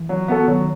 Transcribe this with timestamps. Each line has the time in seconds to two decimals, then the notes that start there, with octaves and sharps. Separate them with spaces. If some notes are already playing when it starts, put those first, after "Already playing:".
Already playing: E3
0.09 F#3
0.28 B3 F#4 A4
0.48 D#3 F#3